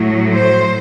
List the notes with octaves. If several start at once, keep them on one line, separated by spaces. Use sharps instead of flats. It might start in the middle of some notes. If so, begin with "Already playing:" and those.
Already playing: A2 F#3
C5